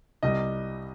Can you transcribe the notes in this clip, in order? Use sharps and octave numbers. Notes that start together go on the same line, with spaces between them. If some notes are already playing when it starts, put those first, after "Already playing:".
C2 C3 G3 D#5